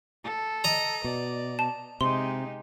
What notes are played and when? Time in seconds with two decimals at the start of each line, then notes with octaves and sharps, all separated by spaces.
0.24 A4
0.64 D#5 A#5
1.04 B2 D5
1.59 A5
2.01 C3 G#3 D#4 G4 C6